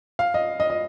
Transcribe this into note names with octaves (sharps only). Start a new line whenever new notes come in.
F5
D#5
D#5
D#5